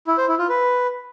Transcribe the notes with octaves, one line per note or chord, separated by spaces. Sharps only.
E4
C5
E4
F4
B4